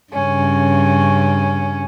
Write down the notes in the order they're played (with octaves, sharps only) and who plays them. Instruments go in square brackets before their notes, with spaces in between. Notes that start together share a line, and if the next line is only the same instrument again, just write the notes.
[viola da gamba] G2 C#3 [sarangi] C#4